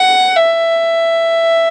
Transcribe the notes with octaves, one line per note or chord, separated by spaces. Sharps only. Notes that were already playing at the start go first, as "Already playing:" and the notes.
Already playing: F#5
E5